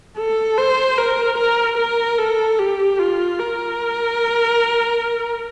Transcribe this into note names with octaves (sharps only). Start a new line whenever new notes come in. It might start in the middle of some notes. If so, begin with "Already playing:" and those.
A4
C5
A#4
A#4
A#4
A4
G4
F4
A#4